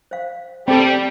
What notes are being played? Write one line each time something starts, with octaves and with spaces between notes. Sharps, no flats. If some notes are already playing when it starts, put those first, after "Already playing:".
C5 F5
G3 C4 A4 G5